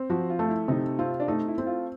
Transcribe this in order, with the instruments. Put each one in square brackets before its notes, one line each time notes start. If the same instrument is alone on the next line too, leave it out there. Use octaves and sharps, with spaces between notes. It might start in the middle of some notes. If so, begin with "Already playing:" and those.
Already playing: [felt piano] C4
[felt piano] F3 [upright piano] F#4
[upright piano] F4
[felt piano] A3
[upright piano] E4
[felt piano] C3 [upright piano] D#4
[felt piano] C4 [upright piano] F4
[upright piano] D4
[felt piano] A3 [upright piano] D#4
[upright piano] E4
[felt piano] C4
[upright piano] F4